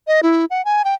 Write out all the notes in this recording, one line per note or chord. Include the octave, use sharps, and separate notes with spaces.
D#5
E4
F#5
G#5
G5